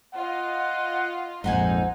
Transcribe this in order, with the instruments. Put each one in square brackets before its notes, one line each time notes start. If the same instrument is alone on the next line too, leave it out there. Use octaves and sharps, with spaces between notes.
[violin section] F4 D#5 [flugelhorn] F#5
[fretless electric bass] A#1 F2 G#2 [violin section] D#4 [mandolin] C5 F#5 G#5